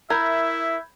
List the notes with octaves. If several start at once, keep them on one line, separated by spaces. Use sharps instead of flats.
E4 A#4 E5 B5 G6 G#6